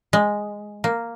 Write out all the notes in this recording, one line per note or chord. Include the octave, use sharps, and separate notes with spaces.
G#3
A#3